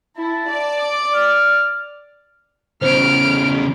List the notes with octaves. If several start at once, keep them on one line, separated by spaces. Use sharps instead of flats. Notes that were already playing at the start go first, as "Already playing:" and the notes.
E4 A5
D5
D6
F6
E2 C#3 C5 F6 D7